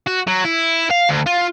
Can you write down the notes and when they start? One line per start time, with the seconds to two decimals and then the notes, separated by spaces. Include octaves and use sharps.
0.07 F#4
0.27 F#3
0.45 E4
0.90 F5
1.09 D2
1.26 F4